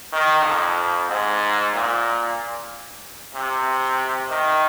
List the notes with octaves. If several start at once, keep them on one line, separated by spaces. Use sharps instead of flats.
D#3
F2
G#2
A#2
C3
D#3